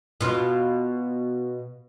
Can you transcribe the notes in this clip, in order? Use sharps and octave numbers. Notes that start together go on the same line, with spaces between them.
B2 F4